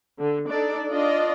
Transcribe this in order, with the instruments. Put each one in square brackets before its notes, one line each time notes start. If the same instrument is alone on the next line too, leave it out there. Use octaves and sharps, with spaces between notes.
[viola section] D3
D4 D#4 A4 D5
D4 F4 D5 D#5